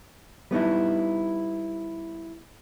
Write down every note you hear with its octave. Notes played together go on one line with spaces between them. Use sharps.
G3 B3 D#4 E4